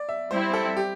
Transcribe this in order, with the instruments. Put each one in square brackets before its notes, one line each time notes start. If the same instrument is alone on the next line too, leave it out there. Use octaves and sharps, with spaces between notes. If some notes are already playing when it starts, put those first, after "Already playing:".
Already playing: [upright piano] D5
E5
[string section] G3 C4 E4 [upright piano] C5
[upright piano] A4
G4